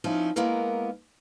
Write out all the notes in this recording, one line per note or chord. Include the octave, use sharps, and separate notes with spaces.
F3 C4 C#4 D#4 E4
G#3 A#3 B3 E4 A#4